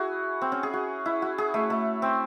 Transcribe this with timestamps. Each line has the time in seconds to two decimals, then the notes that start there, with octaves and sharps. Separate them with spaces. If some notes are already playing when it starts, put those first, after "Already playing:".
Already playing: E4 F#4 G#4
0.42 C4
0.52 C#4
0.63 G#4
0.74 F#4
1.06 E4
1.22 F#4
1.38 G#4
1.54 A3
1.70 A3
2.02 C4